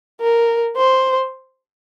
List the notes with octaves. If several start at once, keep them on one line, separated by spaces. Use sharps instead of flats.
A#4
C5